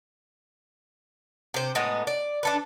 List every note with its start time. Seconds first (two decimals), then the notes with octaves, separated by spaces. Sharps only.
1.54 C3 C5
1.75 A2 G#3 B3 D#4
2.07 D5
2.43 D4 A4 B4